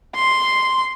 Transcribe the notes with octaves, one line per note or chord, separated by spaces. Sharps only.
C6